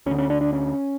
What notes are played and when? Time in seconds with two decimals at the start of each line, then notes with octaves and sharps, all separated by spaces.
0.06 D2 C#4
0.11 D3
0.18 C#4
0.30 D4
0.41 D4
0.53 C#4